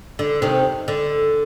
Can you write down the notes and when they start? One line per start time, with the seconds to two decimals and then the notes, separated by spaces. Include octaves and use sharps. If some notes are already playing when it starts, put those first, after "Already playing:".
0.19 D3
0.42 C3 D#3
0.88 D3